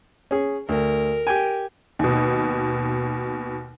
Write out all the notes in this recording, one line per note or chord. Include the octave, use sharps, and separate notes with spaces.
C#4 G#4
D2 A#4
G4 G5 G#5
D#2 B2